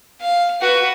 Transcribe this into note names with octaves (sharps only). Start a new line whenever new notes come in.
F5
F#4 B4